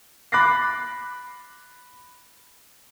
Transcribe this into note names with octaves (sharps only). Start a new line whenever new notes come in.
B5 D6 F#6 A6 A#6 C7